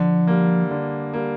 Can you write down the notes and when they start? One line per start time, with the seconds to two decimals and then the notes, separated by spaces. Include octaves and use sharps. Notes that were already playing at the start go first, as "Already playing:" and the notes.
Already playing: D3 F3
0.27 G3 A#3
0.71 D3
1.13 G3 A#3